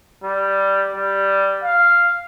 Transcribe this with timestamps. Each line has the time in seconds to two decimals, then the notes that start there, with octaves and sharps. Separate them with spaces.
0.24 G3
0.95 G3
1.63 F5